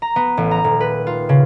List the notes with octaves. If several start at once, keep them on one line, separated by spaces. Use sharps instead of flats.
A#5
B3
A1
A#5
D#1
B4
F4
C#3